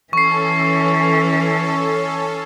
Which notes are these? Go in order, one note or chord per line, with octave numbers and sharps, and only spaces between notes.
E3 C#4 A4 C#6 C7